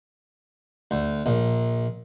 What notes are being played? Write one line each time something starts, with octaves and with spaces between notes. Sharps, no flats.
D2
A#1